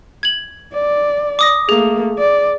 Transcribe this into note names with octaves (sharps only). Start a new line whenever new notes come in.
G#6 F#7
D5
D6 D#6 A#6
A3 A#3 G#4
D5